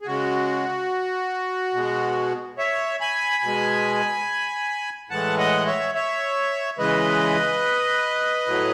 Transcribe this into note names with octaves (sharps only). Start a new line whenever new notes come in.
G#4
C#3 G#3 F#4
B2 G#3
C#5 E5
G#5 B5
B2 G#3
A2 E3 G#3 F#5 A5
D#5 F#5
C#5 E5
C#5 E5
C#3 E3 G#3 B4 D#5
A2 F#3